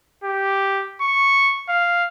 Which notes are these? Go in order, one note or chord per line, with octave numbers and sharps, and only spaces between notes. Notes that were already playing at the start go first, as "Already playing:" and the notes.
G4
C#6
F5